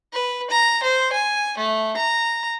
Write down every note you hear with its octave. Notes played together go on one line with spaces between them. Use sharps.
B4
A#5
C5
G#5
A3
A#5